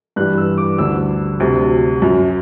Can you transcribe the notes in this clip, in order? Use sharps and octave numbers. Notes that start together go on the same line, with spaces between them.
G2 E3 G3 F#6
E6
D6
D2 D3 G3 E6
D2 C3 F#3
F#2 F#3